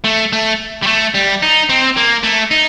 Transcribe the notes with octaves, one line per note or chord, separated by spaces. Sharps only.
A3
A3
G3
A3
G3
D#4
C4
A#3
A3
D#4